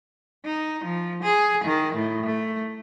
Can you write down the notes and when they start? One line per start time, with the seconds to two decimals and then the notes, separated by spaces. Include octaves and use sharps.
0.45 D#4
0.85 F3
1.23 G#4
1.65 D#3
1.95 A2
2.26 A3